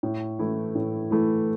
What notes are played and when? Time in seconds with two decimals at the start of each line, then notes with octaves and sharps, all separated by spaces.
0.03 A2
0.39 E3 A3 E4
0.75 A2
1.11 E3 A3 E4